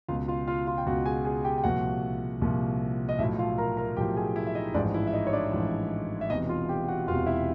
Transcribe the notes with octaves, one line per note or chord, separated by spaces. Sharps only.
C#2 B2 F4 F5
F4 F5
F4 F5
F4 F5
G5
C#2 B2 F#4 F#5
G#4 G#5
G#4 G#5
G4 G5
G5
C2 A#2 F3 F#4 F#5
C2 A#2 F3
D#5
B1 A2 F3 E4 E5
F4 F5
A#4 A#5
A#4 A#5
B1 A2 F3 G4 G5
G#4 G#5
E4 E5
E5
D#4 D#5
A1 G#2 F3 D4 D5
E4 E5
E5
D#4 D#5
C#5
D4 D5
A1 G#2 F3
E5
E1 E2 C3 D#4 D#5
F4 F5
G4 G5
F#4 F#5
E1 E2 C3 F4 F5
E4 E5